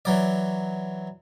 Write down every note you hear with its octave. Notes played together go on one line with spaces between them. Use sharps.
E3 F#3 D5